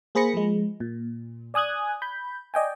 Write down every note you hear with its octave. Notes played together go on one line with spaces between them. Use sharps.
A#3 G#4 C5 B5 A#6 C#7
F3 G#3
A#2
D5 G#5 D#6 F#6 G#6
B5 G6
D5 D#5 G5 G#5